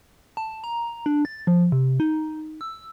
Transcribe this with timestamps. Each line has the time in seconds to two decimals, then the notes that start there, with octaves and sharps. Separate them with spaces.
0.37 A5
0.64 A#5
1.06 D4
1.25 A6
1.47 F3
1.72 C3
2.00 D#4
2.61 E6